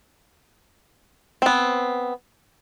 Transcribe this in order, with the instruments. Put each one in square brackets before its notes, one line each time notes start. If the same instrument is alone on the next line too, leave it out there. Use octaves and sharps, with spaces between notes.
[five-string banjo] B3 C4